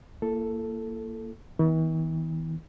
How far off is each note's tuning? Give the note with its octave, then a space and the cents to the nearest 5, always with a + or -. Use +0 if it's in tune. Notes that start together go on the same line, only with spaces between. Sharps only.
A#3 -15 E4 +40 A4 +0
E3 -45 B3 -10